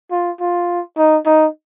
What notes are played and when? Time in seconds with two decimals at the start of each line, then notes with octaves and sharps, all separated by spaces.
0.11 F4
0.40 F4
0.97 D#4
1.26 D#4